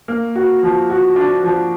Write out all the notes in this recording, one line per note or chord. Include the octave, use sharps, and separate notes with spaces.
A#3
F#4
F3
F#4
D4
F3